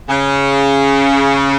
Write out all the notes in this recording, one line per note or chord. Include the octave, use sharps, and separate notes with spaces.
C#3